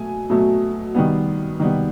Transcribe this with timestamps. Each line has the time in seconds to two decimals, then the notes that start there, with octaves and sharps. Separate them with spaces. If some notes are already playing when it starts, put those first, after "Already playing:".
Already playing: B2 F#3 A3 G#5
0.29 B2 F#3 A3
0.95 D#3 G3 B3
1.60 D#3 G3 B3